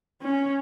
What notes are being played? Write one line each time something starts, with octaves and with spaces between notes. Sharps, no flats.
C#4